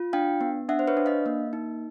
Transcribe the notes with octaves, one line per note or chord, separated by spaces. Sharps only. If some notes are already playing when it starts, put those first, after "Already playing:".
Already playing: F4
D4 F5 G5
B3
D4 E5 F#5
C5
B4 C#5
D4
D#5 F5
A#3
D#4